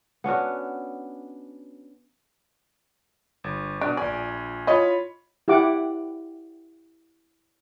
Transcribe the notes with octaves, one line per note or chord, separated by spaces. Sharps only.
B3 C#4 D4 F#4
G1
B2 D4 D7
A#1 D5 G#5
E4 F4 C#5 D#5 B5
E4 G4 F#5 D6